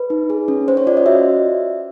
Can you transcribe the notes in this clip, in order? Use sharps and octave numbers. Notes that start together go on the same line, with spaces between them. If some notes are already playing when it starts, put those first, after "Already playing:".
Already playing: B4
D#4
G#4
C#4
C#4 C5
C#5
F4 D5
D#5
F#4 E5